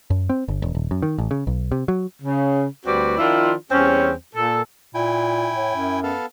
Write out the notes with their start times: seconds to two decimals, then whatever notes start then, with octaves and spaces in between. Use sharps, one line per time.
0.10 F#2
0.29 C4
0.48 G1
0.62 E1
0.75 D#1
0.91 F#2
1.02 D#3
1.18 A1
1.31 C#3
1.47 B1
1.72 C3
1.88 F#3
2.22 C#3
2.85 D2 G3 C4 F#4 B4 D5
3.18 D#3 F3 D4 E4 F4
3.71 E2 G3 C4 C#4
4.35 A#2 A4
4.95 A#2 E4 G5 G#5
5.55 A2
5.75 F#2
6.03 B3 A4 F5